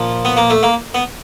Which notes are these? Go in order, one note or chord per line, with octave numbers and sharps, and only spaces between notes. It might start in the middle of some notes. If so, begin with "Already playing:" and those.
Already playing: A#2 F3
B3
A#3
A3
A#3
B3